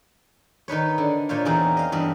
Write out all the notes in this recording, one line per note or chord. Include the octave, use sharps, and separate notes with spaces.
D#3 D#4 B4 C#5
D3
A#2 C5 C#5 F5
E2 A#3 C4 C#4 D#4 G#4
D#5 F5
E2 G2 D#5